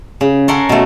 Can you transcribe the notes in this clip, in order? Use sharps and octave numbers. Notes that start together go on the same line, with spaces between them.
C#3
C#4 A4 A#4 F#5 C6
B2 A3